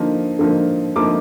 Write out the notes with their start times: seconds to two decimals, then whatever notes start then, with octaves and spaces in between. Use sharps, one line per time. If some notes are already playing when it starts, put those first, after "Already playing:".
Already playing: D3 F3 A#3 D#4
0.39 D3 F3 A#3 D#4
0.96 D3 F3 A#3 D#4 D6